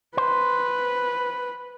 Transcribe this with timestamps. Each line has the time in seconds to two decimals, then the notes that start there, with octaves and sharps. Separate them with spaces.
0.17 B4 C5